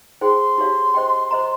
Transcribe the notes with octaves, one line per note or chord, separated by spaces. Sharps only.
D#4 G#4 C5 G5 C6
D#4 G4 C#5 F5
C5 D#5 G5
C5 D#5 A#5